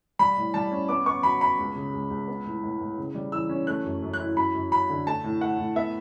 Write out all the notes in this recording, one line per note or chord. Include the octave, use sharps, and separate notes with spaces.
G3 B5
A2
G3 A5
C#4
B3 D6
B3 C#6
F#3 B5
B3 B5
C#2
C#3
C#2
C#2
B3
A2
A2
A2
C#3
G3
E3 E6
C#4
A3 F#6
F#2
F#2
F#6
E4
F#2 B5
F#2
F#2 B5
D3
A3 A5
A2
A3 F#5
A2
B3 E5